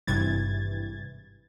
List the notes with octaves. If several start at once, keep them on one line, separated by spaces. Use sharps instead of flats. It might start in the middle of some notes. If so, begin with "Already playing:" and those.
G#1 G2 C3 E3 G#6 A6